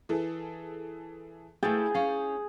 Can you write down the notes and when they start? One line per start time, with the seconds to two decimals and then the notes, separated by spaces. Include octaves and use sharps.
0.09 E3 G#4 A4
1.63 A3 E4 G#4 G6 A6
1.94 C#4 F5